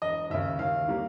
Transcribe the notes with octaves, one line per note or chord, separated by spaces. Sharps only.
E1 D#5
D#2 C#3 E5
D#2 F5
D#3 G3 A#3